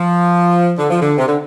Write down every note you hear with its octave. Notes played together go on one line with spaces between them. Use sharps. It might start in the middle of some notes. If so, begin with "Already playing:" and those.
Already playing: F3
D3
F3
D3
C3
D3